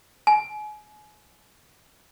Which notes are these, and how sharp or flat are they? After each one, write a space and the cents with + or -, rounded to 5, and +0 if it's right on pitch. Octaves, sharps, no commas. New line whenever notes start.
G#5 +30